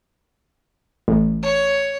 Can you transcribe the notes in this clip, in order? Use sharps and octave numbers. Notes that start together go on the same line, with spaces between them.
A1
C#5